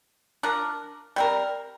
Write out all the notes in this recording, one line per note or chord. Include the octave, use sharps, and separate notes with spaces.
F3 D4 A#4
G3 C4 A#4